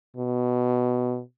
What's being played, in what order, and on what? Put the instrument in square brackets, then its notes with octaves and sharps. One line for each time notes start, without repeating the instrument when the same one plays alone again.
[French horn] B2